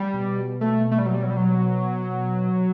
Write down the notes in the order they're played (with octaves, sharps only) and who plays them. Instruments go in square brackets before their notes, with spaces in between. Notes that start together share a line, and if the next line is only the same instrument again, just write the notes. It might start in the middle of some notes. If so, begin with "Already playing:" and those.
Already playing: [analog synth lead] G3
[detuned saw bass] B2
[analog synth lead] A3
A3
G3
F#3
G3
F#3
G3
F#3